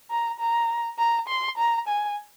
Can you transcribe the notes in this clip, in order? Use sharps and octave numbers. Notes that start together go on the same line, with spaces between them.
A#5
A#5
A#5
C6
A#5
G#5